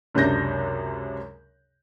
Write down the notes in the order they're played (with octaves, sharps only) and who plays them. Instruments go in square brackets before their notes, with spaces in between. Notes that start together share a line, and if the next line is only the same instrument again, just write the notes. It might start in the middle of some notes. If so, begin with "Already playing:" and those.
[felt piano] C#2 F#2 C3 D4 G6 A#6